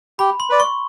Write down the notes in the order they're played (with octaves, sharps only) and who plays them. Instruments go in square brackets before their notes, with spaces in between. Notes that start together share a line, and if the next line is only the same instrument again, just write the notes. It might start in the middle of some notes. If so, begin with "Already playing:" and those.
[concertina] G4 [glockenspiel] B5
[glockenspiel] C6
[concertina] B4 D5
[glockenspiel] C#6